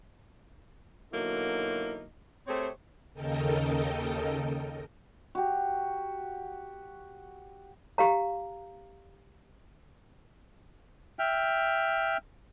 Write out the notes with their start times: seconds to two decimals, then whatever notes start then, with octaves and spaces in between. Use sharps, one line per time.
1.12 B2 D3 F#3 A#3 D#4 E4
2.47 A3 C4 G4 G#4 C5 C#5
3.14 D#2 C#3 A4 A#4 D#5 G5
5.35 F#4 G4
7.98 G4 F5 A#5
11.19 E5 G5 F6